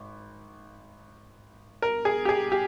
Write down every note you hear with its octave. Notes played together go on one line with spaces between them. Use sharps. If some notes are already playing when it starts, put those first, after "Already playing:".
Already playing: G#1
A#4
G#4
G4
G#4
G4